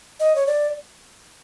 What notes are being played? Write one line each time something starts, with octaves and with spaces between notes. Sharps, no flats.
D#5
C#5
D5